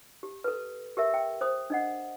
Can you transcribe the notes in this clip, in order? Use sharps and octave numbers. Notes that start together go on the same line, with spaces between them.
G4
A4 B4
G4 A#4 E5
G5
C5 D#6
D4 D#5 F#5